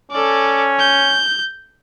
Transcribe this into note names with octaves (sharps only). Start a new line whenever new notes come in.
C#4 A4 D5
G6